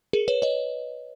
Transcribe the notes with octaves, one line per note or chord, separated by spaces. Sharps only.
G#4 A#4
B4 C#5
C#5 D#5